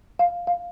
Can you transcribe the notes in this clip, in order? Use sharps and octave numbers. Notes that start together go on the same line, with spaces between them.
F5
F5